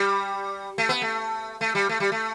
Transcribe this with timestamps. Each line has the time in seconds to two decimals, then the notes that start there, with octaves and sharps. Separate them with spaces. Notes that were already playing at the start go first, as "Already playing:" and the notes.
Already playing: G3
0.78 A3
0.89 B3
1.02 A3
1.61 A3
1.75 G3
1.89 A3
2.00 G3
2.12 A3